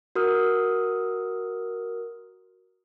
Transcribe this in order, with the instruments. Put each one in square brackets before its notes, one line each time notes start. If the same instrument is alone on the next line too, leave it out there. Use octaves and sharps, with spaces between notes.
[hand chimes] F#4 A#4 D#6 F6